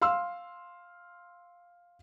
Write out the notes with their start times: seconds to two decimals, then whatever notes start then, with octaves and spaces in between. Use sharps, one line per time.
0.02 F5 C6 E6